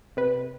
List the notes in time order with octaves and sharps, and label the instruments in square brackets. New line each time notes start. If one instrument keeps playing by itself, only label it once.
[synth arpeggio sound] C3 B4